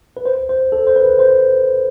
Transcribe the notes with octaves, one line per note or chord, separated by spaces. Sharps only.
B4
C5
C5
A4
C5
B4
C5